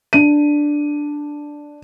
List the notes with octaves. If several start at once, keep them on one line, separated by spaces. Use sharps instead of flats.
D4 D#7